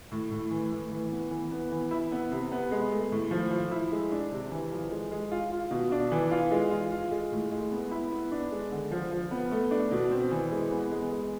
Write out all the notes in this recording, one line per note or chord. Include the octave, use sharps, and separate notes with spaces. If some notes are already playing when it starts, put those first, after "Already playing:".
A2
A2
E3
A2
E3
B3
E3
B3
E3
E4
B3
C3
B3
G#3
A3
A2
F3
F3
E4
G#3
D4
C3
E3
F3
G#3
G#3
F4
F4
B2
D4
E3
F4
G#3
F4
F4
G#3
A2
G#3
B3
E4
B3
D4
G#3
D3
F3
F3
B3
A3
D4
B2
C4
E3
G#3
B3
G#3
G#3